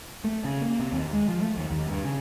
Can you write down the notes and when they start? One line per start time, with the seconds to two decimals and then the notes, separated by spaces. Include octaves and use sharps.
0.24 A3
0.44 C#3
0.61 A#3
0.79 C3
0.92 D#2
1.13 G#3
1.28 F3
1.41 A3
1.57 D#2
1.71 D#2
1.86 G2
2.05 C#3